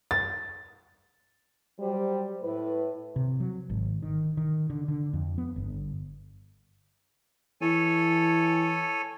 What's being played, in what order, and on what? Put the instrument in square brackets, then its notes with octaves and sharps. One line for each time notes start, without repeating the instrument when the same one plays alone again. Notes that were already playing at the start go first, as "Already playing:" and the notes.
[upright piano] A6
[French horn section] F#3 G3 C5
A2 B4
[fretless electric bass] C3
F#3
G#1
D#3
D#3
D3
D3
F2
B3
G1
[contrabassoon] E3 [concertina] A4 C#5 G#5